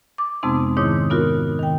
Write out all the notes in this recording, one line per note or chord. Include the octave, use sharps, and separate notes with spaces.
D6
F2 C3 G#3 B3 C4 D#4
G#2 D#3 E4 C#5 D6 D#6
B3 D#4 F4 F#4 A#4
D#3 G5